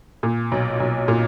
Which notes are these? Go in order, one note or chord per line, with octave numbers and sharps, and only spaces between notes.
A#2
B1
B1
A#2